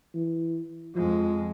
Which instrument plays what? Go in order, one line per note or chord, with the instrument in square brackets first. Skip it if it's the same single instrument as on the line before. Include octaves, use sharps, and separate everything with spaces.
[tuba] E3
[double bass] F2 G#3 [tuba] F3